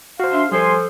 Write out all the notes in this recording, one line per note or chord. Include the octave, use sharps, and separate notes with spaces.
F#4 C5 F5
D4 E5 C6
F3 G3 A4 C5 G#5 C6